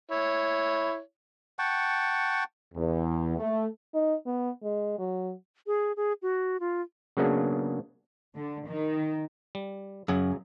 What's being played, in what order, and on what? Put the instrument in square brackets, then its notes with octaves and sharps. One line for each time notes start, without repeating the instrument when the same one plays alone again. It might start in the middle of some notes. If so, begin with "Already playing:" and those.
[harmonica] E4 C#5
[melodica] F#5 G5 A5 C#6
[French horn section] E2
A3
[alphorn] D#4
B3
G#3
F#3
[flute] G#4
G#4
F#4
F4
[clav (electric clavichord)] C#3 F#3 A#3 B3 D4 G#4
[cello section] D3
D#3
[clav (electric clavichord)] G3
[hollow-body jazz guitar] F#2 [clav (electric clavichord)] C#3 F#3 G#4